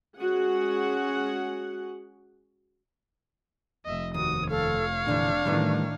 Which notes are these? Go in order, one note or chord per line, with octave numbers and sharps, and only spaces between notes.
G#3 C#4 F#4 G#4 F#5
F1 D#5 E5
D#2 F#4 D#6
A4 C#5 F5
A#2 D3 E3 D4
A2 D#3 E3 G3 A3 B3